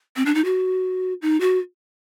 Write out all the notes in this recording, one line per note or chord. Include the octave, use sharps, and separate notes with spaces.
C4
D4
D#4
F#4
D#4
F#4